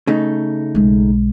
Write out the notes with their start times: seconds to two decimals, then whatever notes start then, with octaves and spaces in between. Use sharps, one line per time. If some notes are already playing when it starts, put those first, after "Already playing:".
0.07 C#3 A3 D#4
0.75 B1 G#3